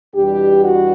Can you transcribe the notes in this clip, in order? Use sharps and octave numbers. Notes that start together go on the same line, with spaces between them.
E2 B2 G3 D4 G4
F#4